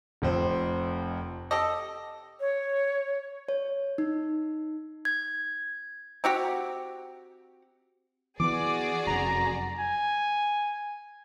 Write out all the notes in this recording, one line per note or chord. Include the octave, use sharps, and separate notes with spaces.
F1 F2 C5
G4 A4 D#5
C#5
C#5
D#4
G#6
C4 F#4 G4
E3 B3 F#4 G#4 D5 D6
F1 F#2 A#5
G#5